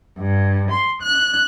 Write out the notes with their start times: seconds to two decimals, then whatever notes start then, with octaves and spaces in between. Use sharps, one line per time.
0.17 G2
0.70 C6
1.01 F#6